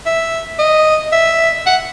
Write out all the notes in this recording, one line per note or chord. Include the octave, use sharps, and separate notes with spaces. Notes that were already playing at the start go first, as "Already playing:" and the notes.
E5
D#5
E5
F#5